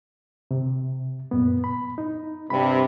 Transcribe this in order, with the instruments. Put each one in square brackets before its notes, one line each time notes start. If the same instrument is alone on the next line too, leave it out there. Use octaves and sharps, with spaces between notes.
[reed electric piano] C3
F#2 A#2 B3
B5
D#4
[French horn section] G2 C3 [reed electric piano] B5